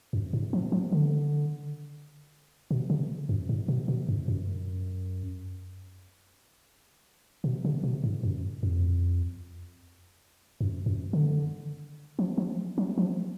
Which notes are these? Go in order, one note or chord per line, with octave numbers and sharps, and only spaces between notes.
F#2
G#2
F3
F3
D3
B2
C#3
F#2
G#2
B2
B2
F#2
F#2
B2
C#3
B2
G#2
F#2
F2
F#2
F#2
D3
F3
F3
F#3
F3